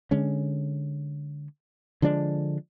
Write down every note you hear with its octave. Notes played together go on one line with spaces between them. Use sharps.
D3 G#3 C#4
D3 F3 G#3 D4